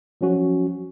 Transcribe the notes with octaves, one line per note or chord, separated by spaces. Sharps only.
F3 F#3 C#4 F#4